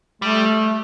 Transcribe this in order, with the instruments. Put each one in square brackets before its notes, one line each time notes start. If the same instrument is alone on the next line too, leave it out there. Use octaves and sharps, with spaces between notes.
[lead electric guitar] G3 [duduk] A3